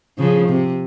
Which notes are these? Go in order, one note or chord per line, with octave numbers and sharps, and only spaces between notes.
C#3 F3
C3